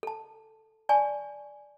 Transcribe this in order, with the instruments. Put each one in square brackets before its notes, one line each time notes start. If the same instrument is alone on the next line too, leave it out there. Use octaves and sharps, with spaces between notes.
[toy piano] A4 A5
D5 G#5 A5 C#6